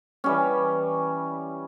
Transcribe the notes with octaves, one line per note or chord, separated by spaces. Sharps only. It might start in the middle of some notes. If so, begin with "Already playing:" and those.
E3 G3 C#4